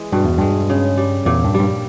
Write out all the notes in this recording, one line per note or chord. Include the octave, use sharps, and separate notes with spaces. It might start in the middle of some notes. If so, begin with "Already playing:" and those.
Already playing: E3 G#3
G2 B2
E2
G2 G#3
C#3
G3
E2 A#2
G2
G3
G2